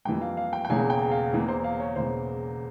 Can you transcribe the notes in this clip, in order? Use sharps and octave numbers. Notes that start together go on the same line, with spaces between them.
F2 E3 G3 A#3 G5
F5
F5
G5
G5
E1 E2 C#3 E3 A#3 G#5
G5
F5
E2 E3 A#3
C5
F5
C#5
E1 E2 C#3 E3 A#3 C5